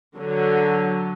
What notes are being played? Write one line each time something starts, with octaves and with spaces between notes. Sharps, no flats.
D3 F#3